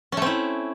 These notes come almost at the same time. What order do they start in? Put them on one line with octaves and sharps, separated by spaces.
C#4 A3 C4 E4